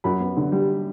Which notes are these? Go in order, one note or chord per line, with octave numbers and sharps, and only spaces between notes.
F#2 B5
B3
D3
G3